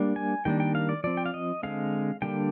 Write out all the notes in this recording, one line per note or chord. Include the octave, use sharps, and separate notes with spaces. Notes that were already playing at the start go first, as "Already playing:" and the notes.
Already playing: G3 A#3 D4
G#5
D#3 G3 A#3 D4 G5
G5
F5
D5
F3 C4 D5
G5
F5
D#5
D3 G#3 C4 F5
D3 G3 A#3 D4 G5